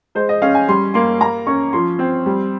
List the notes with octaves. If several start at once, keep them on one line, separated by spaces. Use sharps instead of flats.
G#3 C5
D#5
C#4 F5
G#5
G3 C6
A#3 C6
A#3 A#5
C#4 C#6
F3 C6
C4
G3